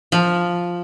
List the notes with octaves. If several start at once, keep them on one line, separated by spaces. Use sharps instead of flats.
F3